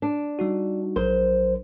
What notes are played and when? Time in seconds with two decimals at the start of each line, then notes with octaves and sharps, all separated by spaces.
0.02 D4
0.39 G3 D#4 F#4
0.96 A#1 F#3 A#4 C5